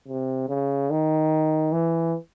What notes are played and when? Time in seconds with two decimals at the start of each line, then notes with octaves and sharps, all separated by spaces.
0.08 C3
0.49 C#3
0.90 D#3
1.73 E3